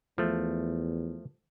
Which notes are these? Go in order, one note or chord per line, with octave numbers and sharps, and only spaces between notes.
E2 F3 A3